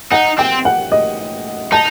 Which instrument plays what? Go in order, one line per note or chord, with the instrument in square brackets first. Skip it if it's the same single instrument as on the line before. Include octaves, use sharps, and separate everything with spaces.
[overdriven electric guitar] D#4 [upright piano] F#5
[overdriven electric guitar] C4 [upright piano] G5
[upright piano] F#5
D#5
[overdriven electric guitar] D#4 [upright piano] A5